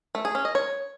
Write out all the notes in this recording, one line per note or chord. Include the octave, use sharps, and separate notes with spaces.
A3
G#4
C#4
D#5
C#5